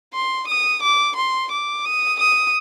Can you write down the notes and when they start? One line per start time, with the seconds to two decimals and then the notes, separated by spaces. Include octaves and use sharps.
0.14 C6
0.48 D#6
0.82 D6
1.16 C6
1.51 D6
1.85 D#6
2.19 D#6